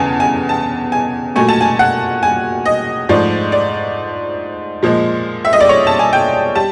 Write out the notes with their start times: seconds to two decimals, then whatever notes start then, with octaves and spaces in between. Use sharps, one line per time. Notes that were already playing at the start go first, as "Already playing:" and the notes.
Already playing: E2 C#3 G#5 A5
0.20 G#5
0.49 A5
0.92 G#5
1.36 A#2 F#3 A3 G#5
1.48 A5
1.61 G#5
1.79 F#5
2.23 G#5
2.65 D#5
3.09 G#2 F3 A3 D5
3.52 D5
4.83 A#2 F3 G#3
5.45 E5
5.53 D#5
5.60 D5
5.69 C#5
5.87 A5
5.99 G#5
6.13 G5
6.55 G3 A5